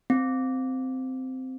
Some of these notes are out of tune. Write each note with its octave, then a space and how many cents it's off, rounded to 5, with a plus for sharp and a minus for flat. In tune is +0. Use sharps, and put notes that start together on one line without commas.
C4 -10